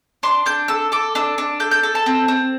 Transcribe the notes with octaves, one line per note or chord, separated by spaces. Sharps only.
D4 C6
D4 G6
A4 E6
A4 D6
D4 E6
D4
A4 G6
G6
A4
A5
C4
C4